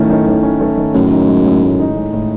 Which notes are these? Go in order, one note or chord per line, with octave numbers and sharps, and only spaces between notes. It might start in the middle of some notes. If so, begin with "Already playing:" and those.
Already playing: A2 D#3 A3 C#4
D#3
D#3
C#4
A3
D#3
F#2 A2
D#4
G#3
A2
A2
D#4
G#3
A2